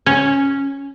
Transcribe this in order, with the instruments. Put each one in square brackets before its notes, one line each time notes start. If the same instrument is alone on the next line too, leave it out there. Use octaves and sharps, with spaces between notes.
[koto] C#4